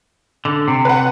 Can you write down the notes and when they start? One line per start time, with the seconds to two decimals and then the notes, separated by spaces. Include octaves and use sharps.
0.45 D3
0.68 C3
0.85 B4 F#5